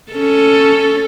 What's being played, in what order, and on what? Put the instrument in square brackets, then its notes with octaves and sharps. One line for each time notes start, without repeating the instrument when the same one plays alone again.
[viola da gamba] C#4 A4